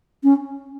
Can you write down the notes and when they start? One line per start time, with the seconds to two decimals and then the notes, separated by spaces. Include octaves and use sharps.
0.24 C#4